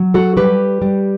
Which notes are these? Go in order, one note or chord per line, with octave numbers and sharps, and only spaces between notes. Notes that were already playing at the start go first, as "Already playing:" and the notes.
Already playing: F#3
F#4 A4
G3 G4 B4
G3